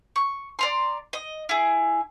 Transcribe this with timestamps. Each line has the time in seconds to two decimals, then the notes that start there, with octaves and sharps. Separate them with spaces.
0.16 C#6
0.59 D5 A#5 C6
1.13 D#5
1.49 E4 G#4